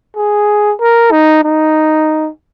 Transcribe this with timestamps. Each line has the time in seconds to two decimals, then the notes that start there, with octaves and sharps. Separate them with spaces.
0.16 G#4
0.80 A#4
1.12 D#4
1.44 D#4